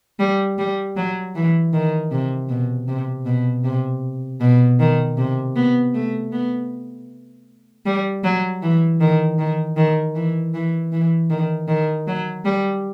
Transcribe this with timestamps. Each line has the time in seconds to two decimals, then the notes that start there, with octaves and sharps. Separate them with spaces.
0.19 G3
0.58 G3
0.96 F#3
1.35 E3
1.73 D#3
2.11 C3
2.49 B2
2.88 C3
3.26 B2
3.64 C3
4.41 B2
4.80 D#3
5.17 C3
5.56 B3
5.94 A3
6.32 B3
7.86 G3
8.24 F#3
8.62 E3
9.00 D#3
9.38 D#3
9.77 D#3
10.15 E3
10.54 E3
10.92 E3
11.30 D#3
11.68 D#3
12.07 F#3
12.45 G3